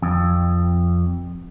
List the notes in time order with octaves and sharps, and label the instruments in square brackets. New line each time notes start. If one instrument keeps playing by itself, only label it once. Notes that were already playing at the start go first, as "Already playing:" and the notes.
[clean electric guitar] F2